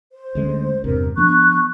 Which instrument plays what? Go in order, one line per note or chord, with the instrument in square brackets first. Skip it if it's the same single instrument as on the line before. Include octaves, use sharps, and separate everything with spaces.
[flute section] C5
[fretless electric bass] D2 G#3 C#4
[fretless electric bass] E2 G2 C3 [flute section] A#4
[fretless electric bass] F3 B3 D4 [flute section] C#6 F#6